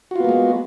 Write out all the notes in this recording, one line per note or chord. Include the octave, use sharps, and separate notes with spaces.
G#3 A#3 B3 F4 F#4